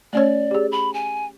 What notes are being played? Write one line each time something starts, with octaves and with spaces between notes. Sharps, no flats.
A3 C#4 C#5 D5
G4 G#4
B5
G#5